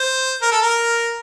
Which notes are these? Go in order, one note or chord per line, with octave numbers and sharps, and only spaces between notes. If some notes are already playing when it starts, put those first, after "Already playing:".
Already playing: C5
A#4
A4
A#4